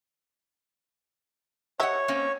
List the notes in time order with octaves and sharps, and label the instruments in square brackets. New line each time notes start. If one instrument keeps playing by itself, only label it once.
[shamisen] G4 E5 [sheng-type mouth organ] C#5 [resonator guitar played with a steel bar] D#5 F#5
[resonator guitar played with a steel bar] A#3 C4 C#4